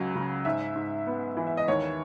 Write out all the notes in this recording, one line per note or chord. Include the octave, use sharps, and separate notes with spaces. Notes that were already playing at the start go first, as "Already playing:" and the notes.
Already playing: C#2 F#3 C#4
C#3
G#2 E5
G#2
B3
E3
E5
D#5
D#2 C#5